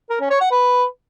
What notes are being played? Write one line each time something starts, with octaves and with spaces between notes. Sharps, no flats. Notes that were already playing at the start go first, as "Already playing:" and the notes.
A#4
C#4
C#5
F#5
B4